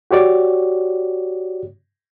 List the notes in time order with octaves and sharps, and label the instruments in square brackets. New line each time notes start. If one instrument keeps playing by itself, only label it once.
[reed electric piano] F#4 G4 C#5 D5